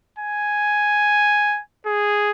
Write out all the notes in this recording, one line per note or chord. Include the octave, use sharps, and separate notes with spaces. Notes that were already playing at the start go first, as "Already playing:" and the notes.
G#5
G#4